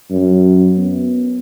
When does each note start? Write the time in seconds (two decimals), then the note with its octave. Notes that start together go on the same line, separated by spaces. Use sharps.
0.11 F#2
0.77 B3